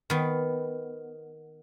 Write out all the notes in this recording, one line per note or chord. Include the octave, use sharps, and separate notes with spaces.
D#3 B3